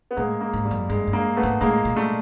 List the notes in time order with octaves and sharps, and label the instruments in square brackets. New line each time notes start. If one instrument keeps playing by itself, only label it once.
[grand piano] B3
[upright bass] A2 [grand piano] G#3 A#3
[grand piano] G#3 A#3
[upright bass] G#2
[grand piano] G3
[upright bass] F#2
[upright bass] G2 [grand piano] G#3
[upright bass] G2
[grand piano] G#3 A#3
A3 B3
[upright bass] G#2
[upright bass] A2 [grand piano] G#3 A#3
[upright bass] A#2
[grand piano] G3 A3